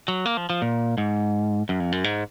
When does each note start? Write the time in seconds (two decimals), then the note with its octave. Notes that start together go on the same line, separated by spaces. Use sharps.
0.08 F#3
0.26 A#3
0.37 F3
0.50 F3
0.62 A#2
0.98 G#2
1.69 F#2
1.80 F2
1.92 F#2
2.04 G#2